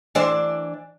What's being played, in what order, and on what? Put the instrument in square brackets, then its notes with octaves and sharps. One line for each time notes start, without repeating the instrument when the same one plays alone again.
[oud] E3 D4 C5